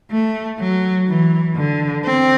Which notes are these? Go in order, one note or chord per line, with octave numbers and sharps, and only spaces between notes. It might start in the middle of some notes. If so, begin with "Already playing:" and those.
A3
F#3
E3
D3
C4